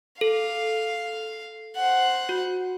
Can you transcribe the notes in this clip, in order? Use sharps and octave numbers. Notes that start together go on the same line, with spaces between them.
A4 F5
C5 F#5
F#4